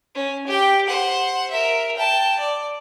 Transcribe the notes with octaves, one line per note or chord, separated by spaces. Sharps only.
C#4
G4 G5
C5 F#5
A#4 E5
G5 A5
D5